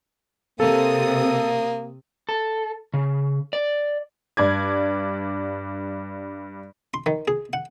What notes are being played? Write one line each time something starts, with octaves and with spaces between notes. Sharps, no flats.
C3 A#3 A4 D#6
A4
C#3
D5
G2 D5 G#6
C6
D#3
G#4
F#5